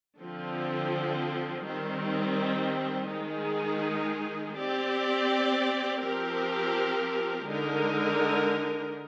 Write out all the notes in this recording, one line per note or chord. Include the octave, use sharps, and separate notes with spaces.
D3 F3 C4
D#3 G3 C4
D#3 G#3 D#4 G#4
C4 G4 D5
F3 C4 G4 A#4
D3 G#3 D#4 A#4